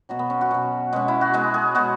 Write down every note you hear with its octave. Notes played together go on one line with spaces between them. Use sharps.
B2 F#3 F#4
B3
C#4
F#4
B2 F#3
B2 G#3 C#4
E4
F#4
B2 G#3 G#4
G#4
B2 G#3 F#4